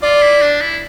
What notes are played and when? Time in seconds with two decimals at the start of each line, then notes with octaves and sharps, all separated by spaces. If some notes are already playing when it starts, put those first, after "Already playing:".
0.03 F4 D5
0.23 E4
0.42 D4
0.61 E4